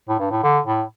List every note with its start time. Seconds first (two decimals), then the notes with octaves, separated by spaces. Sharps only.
0.09 A2
0.19 G2
0.31 A2
0.43 D3
0.66 A2